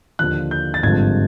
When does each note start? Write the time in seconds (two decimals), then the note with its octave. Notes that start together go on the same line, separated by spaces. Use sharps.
0.19 D#2 D3 F3 F#6
0.51 G6
0.74 A6
0.83 G#1 G2 D3 F3 G#6